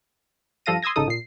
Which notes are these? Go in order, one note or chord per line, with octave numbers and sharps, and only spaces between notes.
G2 F3 A4 F5 A#6 D#7
C6 D#6 E6 G#6 A#6
G#1 C#3 D#4 A4 D#6
A#2 C7